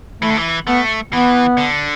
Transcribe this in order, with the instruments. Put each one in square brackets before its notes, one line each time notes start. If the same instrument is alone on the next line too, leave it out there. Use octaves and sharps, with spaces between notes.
[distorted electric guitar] E3 [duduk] A3
[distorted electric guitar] D3
E3
[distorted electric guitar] A3 [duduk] B3
[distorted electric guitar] E3 [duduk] B3
[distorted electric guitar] D3